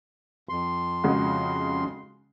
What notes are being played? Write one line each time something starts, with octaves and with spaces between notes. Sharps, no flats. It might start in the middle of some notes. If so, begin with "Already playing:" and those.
F2 C6
C#3 G#3 F#4